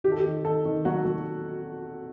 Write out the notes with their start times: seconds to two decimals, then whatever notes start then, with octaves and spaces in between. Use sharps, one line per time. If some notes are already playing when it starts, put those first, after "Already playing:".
0.04 D#3 G4
0.12 A4
0.19 G4
0.25 D#3
0.44 D#3 A4
0.65 D#3
0.85 F#3 F#4
1.05 F#3